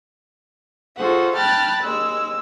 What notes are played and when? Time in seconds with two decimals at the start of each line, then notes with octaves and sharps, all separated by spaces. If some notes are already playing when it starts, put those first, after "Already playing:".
0.97 F4 F#4 G#4 A4 C5 F#5
1.36 G5 A5 B5 F6 F#6 A6
1.83 D#2 G#3 E6